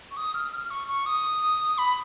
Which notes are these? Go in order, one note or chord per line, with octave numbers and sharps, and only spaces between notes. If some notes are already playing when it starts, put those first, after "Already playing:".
C#6
D#6
F6
F6
C#6
C#6
D#6
B5